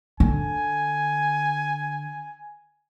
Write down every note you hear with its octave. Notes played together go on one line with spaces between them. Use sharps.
D3 G#5